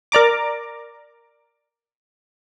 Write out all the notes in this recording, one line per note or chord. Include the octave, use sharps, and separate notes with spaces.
A#4 D5 A#5 D6